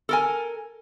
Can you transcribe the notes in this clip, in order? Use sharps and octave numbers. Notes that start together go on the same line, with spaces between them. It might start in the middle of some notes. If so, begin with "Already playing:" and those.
A4 A#4 G#5